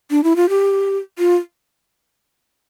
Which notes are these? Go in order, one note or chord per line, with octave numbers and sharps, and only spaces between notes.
D4
E4
F4
G4
F4